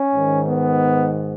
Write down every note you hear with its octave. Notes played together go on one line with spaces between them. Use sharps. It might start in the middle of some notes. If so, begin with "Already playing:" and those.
Already playing: C#4
G#2 D#3
B3